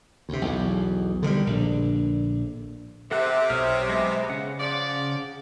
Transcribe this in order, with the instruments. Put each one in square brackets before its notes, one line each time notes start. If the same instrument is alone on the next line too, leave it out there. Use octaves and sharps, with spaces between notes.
[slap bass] D2 C3
B1 E2
D3 D#3 F3 G3
A#1 D3
[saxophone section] C3 [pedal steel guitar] A4 F#5 F#6
[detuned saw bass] B1 [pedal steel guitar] C#5 D#6 F6
[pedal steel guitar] G#3 B3
[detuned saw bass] C#3 [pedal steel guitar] F#5
[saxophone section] F3 D5